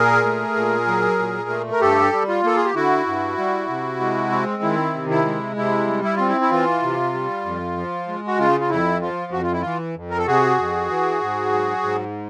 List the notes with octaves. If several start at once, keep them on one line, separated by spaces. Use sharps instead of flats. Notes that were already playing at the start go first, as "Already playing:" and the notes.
Already playing: A#2 G#4 A#4
A3
A#2
F#3
A#2
A3
A#4
G2 G4 A4
G3
F4
A#3 A4
G#4
G4
D3 E4 F#4
G2
G3
C3
G#3
C4
D#3 E4
C3
E4
G#3
C3 E4
G3
E4
C4 F4
E4
E4
E3 F4
C3
G3
F2
F3
G#3
F#4
C#3 F4
F4
F2 E4
F3 F4
F2 F#4
F4
E4
E3 F4
F2
A#4
A4
C3 F#4 G#4
F2
E3
G#2
F#3
G#2